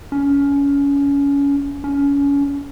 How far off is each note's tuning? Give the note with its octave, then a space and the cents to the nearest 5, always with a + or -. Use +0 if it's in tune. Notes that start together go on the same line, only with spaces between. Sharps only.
C#4 +25
C#4 +30